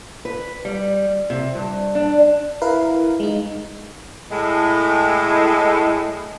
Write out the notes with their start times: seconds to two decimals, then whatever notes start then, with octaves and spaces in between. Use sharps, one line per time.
0.25 B4
0.65 G3
1.30 C3
1.55 G2
1.95 D4
2.62 E4 A#4 B4 F5
3.20 G#3 D#4
4.31 A2 G#3